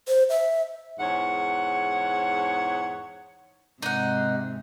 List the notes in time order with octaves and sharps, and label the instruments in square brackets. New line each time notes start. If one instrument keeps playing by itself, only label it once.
[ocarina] C5
E5
[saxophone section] E2 G#2 C#5 F#5
[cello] G#2 C3 [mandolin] D#4 F#5